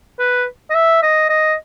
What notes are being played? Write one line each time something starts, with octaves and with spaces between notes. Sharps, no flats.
B4
D#5
E5
D#5
D#5